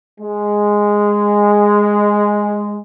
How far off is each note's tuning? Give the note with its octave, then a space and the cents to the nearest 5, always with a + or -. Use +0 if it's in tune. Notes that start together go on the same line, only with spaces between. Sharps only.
G#3 -5